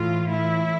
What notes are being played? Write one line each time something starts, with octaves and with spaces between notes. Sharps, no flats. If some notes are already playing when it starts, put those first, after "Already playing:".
Already playing: A2 E3 F4
A2 E3 E4